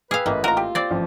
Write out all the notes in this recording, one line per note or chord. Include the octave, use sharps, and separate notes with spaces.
G#4 B4 F5 G5 E6 F6
A1 A#3 D#5 E5
F4 A#4 F#5 A#5
G4
C4 D5 A6
A1 F3